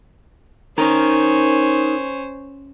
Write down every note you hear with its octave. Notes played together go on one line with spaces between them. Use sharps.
C#4 D#4 A#4 C5 A#5